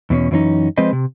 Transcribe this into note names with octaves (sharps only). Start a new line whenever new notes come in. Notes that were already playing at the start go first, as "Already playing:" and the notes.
E2 B2 C4 C#4
F#2 E3 C#4 D#4
F3 G#3 C4 B4 C5 D#5
C3